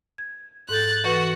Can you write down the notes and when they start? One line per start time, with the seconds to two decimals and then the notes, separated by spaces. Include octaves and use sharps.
0.18 G#6
0.69 G#2 A4 F#6 G6 A6
1.04 E3 F#4 B4